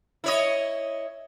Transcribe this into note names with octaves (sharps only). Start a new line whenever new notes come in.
E4 C#5 D#5